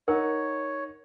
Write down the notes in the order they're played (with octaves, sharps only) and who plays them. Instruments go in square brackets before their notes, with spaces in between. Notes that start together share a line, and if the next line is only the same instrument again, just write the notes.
[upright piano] D#4 F#5 [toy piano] A#4 [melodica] C#5